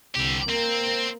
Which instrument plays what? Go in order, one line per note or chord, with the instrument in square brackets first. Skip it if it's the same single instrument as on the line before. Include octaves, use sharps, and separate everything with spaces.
[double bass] C2 [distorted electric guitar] D3 G4
[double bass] A#3 [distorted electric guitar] C4